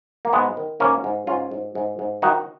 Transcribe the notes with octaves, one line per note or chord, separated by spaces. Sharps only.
A#3
G#2 G#3 B3
D#3
G#2 A#3 C#4
G#2
G#2 C#4 F4
G#2
G#2
G#2
D#3 D#4 F#4